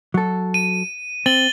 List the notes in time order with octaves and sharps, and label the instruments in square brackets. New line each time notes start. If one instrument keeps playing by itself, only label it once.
[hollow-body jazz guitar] F#3 A4
[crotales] D#7
[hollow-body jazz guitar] C4 [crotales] A6 F#7 G7